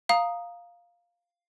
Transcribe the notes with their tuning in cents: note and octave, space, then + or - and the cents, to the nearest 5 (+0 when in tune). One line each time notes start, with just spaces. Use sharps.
F5 +0 A#5 +0 D#6 +0